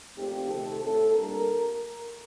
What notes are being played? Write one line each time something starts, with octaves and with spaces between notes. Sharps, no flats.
A#2 F3 A3 C4 D#4 G4
C3 D#3 A3 A4
A2 A3 C4 A4
A#2 G3 A#3 D4 A#4